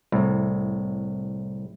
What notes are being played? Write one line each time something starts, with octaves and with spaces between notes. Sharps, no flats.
C2 A2